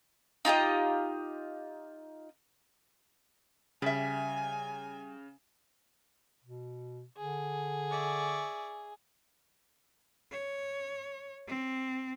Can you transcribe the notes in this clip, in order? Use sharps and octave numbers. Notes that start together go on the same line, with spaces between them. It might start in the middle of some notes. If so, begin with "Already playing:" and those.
D#4 F4 G4 D#5
C#3 G3 E5 G#5
B2
D3 G#4
D5 E5 C#6
C#5
C4